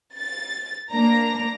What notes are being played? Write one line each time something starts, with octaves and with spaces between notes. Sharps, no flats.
A6
A#3 D4 A#5